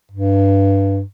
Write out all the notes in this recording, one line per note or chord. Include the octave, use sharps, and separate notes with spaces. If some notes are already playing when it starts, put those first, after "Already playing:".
G2